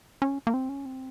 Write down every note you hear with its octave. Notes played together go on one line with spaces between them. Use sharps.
C#4
A#3
C4
C#4
C4